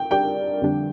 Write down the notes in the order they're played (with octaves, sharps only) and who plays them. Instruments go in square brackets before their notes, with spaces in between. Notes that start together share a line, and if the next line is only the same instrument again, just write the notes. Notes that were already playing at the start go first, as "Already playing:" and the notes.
Already playing: [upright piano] G5
[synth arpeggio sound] G3 D4 G4 A#4 D5 [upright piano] G5
[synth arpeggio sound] F2 D3 G3 D4